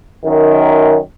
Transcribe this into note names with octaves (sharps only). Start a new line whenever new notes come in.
F#2 D#3